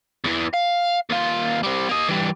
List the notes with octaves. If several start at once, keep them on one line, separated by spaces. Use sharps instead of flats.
E2 E3
F5
D#2 F4
G3 C4
A#3 D#5
E3 G3